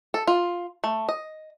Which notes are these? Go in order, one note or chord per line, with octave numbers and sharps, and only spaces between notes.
A4
F4
A3
D#5